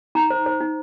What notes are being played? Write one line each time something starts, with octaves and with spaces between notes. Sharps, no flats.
D#4 A#5
C5
C5
D#4